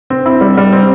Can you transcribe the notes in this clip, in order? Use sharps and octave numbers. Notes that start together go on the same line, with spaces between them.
C4
E4
G3
G3
C4